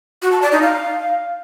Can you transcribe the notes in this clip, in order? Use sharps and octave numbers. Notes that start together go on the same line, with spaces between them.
F#4
A5
D5
D#4
F5